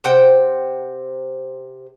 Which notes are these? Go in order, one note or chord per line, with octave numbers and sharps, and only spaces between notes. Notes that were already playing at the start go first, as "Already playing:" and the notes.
C3 C5 F#5 G5